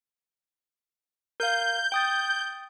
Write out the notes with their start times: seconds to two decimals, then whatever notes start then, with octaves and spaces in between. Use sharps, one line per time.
1.40 A#4 F5 G6
1.92 G5 D#6 A6